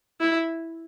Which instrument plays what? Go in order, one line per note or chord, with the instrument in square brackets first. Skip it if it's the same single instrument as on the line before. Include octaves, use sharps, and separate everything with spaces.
[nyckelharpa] E4